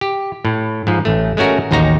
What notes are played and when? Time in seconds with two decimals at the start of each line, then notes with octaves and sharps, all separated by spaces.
0.01 G4
0.45 A2
0.87 G#2 F3
1.05 A1 A3
1.37 G#3 A3 C#4 F#4 A#4
1.71 A1 D#2 D#4 F#4 A#5